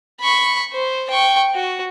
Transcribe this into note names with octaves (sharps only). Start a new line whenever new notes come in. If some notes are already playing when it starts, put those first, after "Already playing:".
B5 C#6
C5
G5 C#6
F#4